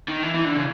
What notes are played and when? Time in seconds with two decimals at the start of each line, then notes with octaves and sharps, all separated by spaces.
0.08 D#3
0.23 E3
0.34 E3
0.45 D3
0.56 C#3